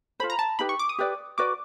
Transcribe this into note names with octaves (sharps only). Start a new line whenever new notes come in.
F4 A4 C5 B5
A#5
A5
D#4 G4 B4 B5
C#6
D6
D#6
G4 B4 D5
F#4 B4 D5 D6